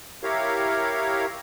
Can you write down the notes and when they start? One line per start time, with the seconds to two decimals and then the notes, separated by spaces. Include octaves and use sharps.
0.23 E4 G4 A#4 C#5 F5